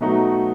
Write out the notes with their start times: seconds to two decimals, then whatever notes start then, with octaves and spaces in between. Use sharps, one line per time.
0.01 B2 F#3 A3 D#4 F#4